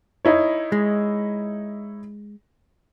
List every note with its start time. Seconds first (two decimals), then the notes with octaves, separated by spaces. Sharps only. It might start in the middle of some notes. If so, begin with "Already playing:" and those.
0.25 D#4 E4 C#5
0.72 G#3